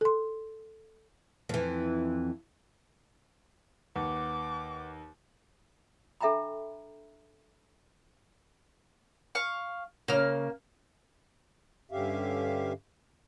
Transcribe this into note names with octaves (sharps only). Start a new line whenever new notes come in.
A4 C6
F2 E3
D#2 B4 F#5 D6
D4 A4 E5 G5 A#5 B5
F5 C#6
C#3 A#3 C#4 F6
G2 D3 C#4 G4 E5 F5